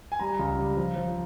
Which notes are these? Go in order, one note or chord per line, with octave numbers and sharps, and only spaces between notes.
G#5
G3 A#5
C#2
G3
F3
F3